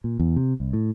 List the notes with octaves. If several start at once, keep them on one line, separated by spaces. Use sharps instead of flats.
A#2
E2
C3
C2
A2